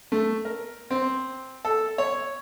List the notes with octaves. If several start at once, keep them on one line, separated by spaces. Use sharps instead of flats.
A3
A#4
C4
A4
C#5